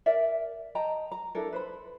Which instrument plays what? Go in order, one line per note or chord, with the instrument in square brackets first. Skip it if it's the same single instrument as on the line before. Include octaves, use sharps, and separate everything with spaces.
[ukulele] A#4 D5 E5
D#5 G5 A5 A#5
A#5
D4 E4 A4 A#4
B4 C5 B5